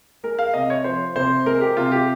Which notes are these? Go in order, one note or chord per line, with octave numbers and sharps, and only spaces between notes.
G#3 A#4
F5
C3 D#5
C#5
F3 C5
C3 C5
G#3 A#4
G4
C3 F4
G4